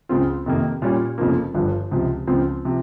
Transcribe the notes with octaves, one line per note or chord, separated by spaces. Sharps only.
C#2 C#3 G#3 C4 F4
F2 C3 D#3 A#3
A#2 G3 C#4 F4
F1 F2 C#3 F3 A#3
G1 G2 F3
C#2 C3 F3
C#2 C#3 F3 C4
C3 F3